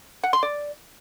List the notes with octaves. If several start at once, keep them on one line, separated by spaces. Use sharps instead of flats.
F#5
C6
D5